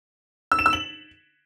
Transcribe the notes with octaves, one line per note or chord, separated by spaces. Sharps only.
E6
E7
E6
F#7